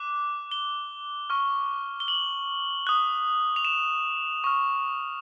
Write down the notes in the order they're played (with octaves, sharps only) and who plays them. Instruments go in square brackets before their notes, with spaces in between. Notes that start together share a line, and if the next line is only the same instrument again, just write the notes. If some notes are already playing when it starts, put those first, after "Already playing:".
Already playing: [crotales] D6 F#6
G7
C#6 F6
G7
F#7
D#6 F#6
F7
E7
C#6 F6